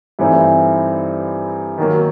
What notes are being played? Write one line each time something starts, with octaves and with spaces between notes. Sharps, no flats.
G2 E3 A3 C4 D#4
D#3 F#3 A#3